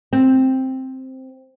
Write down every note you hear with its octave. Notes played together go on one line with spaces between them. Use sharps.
C4